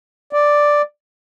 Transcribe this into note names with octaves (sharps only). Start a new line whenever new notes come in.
D5